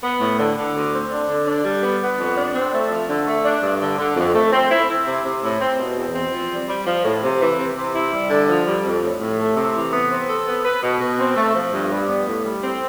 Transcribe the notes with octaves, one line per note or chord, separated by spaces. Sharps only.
B3
A2
D3
D3
D2
C4
D4
D3
D4
G3
B3
B3
F2
D4
C4
A3
F3
D3
A3
D4
G2
D3
D3
F2
A3
C4
E4
E4
C3
C3
A2
C4
B2
E2
C4
F3
G3
G3
F3
A2
C3
E3
C3
C3
E4
G3
D3
F3
G3
F2
A2
A2
A3
C3
E3
B3
C4
A4
B3
B4
B2
B2
C4
A3
F3
G2
G3
B3
A2
G3
C4